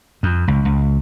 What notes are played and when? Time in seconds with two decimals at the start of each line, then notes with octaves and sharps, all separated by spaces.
0.23 F2
0.48 C#2
0.65 C#2